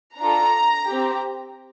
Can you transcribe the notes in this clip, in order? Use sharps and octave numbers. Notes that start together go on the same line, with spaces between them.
D4 F4 A4 A#5
C4 G4